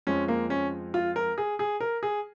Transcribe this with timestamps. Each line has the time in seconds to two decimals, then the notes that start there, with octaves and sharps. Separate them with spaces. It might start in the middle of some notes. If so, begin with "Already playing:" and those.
0.07 F2 F3 G#3 C#4
0.28 A#3
0.50 C#4
0.94 F4
1.16 A#4
1.38 G#4
1.59 G#4
1.81 A#4
2.03 G#4